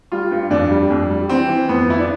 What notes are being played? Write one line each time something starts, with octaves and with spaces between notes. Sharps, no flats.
G3 F4
G2
F2 D4
G3
F2
G3
E3 C4
E3
F2 B3
F2 E4
D4